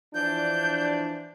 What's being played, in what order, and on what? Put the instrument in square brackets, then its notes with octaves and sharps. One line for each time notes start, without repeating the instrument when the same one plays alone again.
[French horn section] E3 F3 D4 [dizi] G6